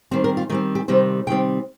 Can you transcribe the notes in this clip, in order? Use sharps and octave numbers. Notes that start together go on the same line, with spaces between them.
D#3 G3 C4 C5
A#4
F4
D#3 G3 C4 D#4
G4
C3 D#3 G3 C4 C5
C3 D#3 G3 C4 G5